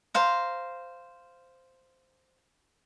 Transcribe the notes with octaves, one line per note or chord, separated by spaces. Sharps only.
C5 F5 A#5